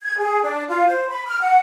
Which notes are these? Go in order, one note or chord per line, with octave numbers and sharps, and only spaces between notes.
G#6
G#4
D4
F4
C5
B5
F6
F#5